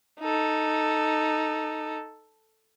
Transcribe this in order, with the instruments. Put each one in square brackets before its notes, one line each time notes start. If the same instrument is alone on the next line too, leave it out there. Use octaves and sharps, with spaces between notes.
[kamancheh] D#4 A4